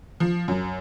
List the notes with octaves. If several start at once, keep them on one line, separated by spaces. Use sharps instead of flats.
F3
F#2